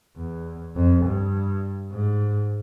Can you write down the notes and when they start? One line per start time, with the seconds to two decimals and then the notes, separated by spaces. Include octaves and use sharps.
0.17 E2
0.76 F2
1.05 G2
1.93 G#2